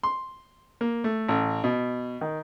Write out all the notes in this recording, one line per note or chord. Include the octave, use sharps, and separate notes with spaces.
C6
A#3
A3
A1
B2
D#3